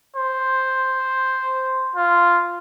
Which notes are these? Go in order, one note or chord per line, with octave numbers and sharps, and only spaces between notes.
C5
F4